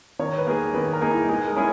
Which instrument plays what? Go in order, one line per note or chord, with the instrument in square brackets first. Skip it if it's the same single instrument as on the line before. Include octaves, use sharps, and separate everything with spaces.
[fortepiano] D#3 [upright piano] C#5
[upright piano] B4
[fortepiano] A#3 D#4 G#4
[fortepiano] D#3 [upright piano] B4
[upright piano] A#4
[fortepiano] A#3 D#4 G#4
[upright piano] E4
[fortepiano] G#3 [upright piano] D#4
[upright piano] A#4
[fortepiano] C#4 E4 G#4